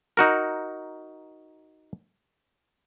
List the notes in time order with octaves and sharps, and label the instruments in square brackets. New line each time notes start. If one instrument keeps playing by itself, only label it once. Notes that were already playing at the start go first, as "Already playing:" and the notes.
[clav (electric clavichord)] D#4 F#4 A#4